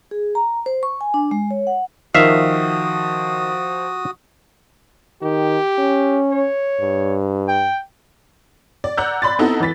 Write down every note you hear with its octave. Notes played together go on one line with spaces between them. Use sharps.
G#4
A#5
C5
C#6
G#5
D4
G#3
C#5
F#5
D#3 F3 F#4 E5 F5 D#6
D#3 G4
C#4
C#5
G2
G5
D5
D5 F#5 A#5 E6 F#6 G6
D5 B5 C6 A6
B3 C4 D#4 E4 F#4 A4
E3 B4 A6 B6